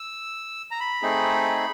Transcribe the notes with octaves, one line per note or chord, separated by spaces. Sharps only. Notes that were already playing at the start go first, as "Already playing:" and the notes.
Already playing: E6
A#5
B5
A3 C4 D#4 G#4